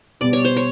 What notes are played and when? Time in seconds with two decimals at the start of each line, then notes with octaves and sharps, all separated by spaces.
0.21 B2 G3 B3 D5
0.33 C#5
0.45 C5
0.57 C#5